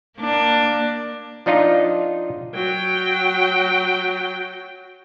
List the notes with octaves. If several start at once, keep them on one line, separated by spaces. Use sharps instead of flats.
A#3 D4
F3 D4 D#4 F4 D#5
F#3 G5